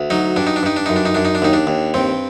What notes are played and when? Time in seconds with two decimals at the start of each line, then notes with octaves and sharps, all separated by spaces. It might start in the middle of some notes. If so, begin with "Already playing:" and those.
Already playing: D2
0.10 F#3 D#4
0.36 G2 D4
0.47 D#4
0.56 D4
0.63 G2 D#4
0.77 D4
0.86 F#2 D#4
0.96 D4
1.05 D#4
1.15 F#2 D4
1.25 D#4
1.35 D4
1.42 D#2 D#4
1.53 D4
1.67 D#2
1.94 G2 C4